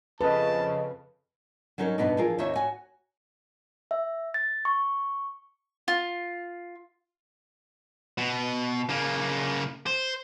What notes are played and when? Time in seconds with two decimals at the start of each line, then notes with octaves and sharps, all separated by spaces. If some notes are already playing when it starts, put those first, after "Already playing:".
0.21 F2 C#3 A4 B4 D#5 A5
1.78 F#3 G3 C#4 D#4 A#4
1.98 E2 G2 B2 B3 D4 D#4
2.17 E3 F3 F4 G#4 A#4
2.38 D#2 D#3 A#3 C4 C#5 E5
2.55 F#4 C#5 G#5
3.91 E5
4.34 A6
4.65 C#6
5.88 F4
8.18 B2
8.89 C#3 A#3
9.86 C5